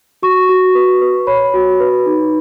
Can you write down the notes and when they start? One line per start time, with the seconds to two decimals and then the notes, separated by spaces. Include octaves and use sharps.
0.22 F#4 C#6
0.49 F#4
0.75 B4
1.01 B4
1.27 C#5 B5
1.54 F#4
1.80 B4
2.06 D#4